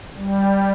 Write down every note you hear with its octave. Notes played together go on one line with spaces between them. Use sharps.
G3